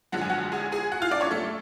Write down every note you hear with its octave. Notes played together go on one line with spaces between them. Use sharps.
F#2 D3 F3 G#3 F#5
G#5
F#4 F#5
G#4 G#5
G#4 G#5
F#4 F#5
F4 F5
D4 D5
C#4 C#5
A3 A4